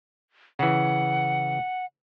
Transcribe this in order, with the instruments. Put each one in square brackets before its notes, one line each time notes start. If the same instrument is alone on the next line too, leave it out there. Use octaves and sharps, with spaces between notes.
[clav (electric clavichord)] C#3 E3 [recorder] F#5